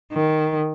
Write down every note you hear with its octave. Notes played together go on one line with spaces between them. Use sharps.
D#3